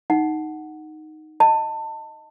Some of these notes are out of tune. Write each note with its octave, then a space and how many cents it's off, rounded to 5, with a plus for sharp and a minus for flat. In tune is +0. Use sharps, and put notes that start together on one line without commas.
D#4 +0 F#5 +0
D#5 +0 A5 +25